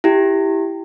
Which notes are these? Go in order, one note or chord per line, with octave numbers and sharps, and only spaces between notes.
E4 G4